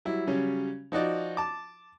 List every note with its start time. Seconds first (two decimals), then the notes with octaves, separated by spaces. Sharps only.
0.05 F#3 G3 E4
0.27 C#3 F#3 G3 C#4
0.92 F3 D#4 F#4 D5
1.37 A5 D6